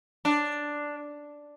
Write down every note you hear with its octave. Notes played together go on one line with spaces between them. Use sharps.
D4